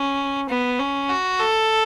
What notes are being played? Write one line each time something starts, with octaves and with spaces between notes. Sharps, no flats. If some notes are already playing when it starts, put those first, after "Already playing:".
Already playing: C#4
B3
C#4
F#4
A4